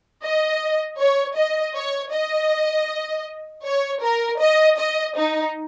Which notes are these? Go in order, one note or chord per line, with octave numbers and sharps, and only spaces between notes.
D#5
C#5
D#5
C#5
D#5
C#5
A#4
D#5
D#5
D#4